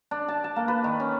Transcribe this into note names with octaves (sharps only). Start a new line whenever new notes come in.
D4
A5
A5
A#3
B4
D#3
C#4